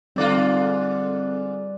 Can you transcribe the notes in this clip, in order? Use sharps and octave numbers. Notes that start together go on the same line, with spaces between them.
G#2 D3 G3 C4 F4 A4 D5 F#6